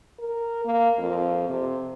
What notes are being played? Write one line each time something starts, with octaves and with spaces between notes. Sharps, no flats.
A#4
A#3
F2
C3